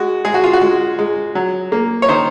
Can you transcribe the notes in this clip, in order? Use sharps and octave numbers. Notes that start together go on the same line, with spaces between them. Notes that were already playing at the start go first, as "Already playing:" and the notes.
Already playing: G#3 F#4
G#3 G#4
F#4
F4
F#4
G#3
G#3
F#3
A#3
C#5
D#3 C5